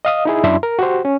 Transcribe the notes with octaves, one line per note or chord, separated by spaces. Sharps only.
D#5 F5 D#6
D#4 E4 G#4
F#2 D4 E4 E5 C6
A#4
F#4 G4 C5
C#4